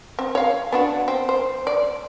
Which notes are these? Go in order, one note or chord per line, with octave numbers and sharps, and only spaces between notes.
C4
C#5 F5
B3 D4 F#4
C4
C5
D5